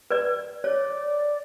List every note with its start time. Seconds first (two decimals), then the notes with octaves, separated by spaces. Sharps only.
0.10 B4 D5
0.64 C#5 D5